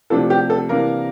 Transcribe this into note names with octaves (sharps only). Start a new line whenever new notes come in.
C3 F3 A3 D4 A4
G4
A4
C3 E3 A#3 D4 A#4